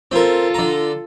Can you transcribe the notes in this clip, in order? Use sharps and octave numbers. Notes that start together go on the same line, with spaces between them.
C4 F4 A4 A#4
D3 A#5